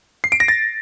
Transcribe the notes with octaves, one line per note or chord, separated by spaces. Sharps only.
C7
D7
A#6
A6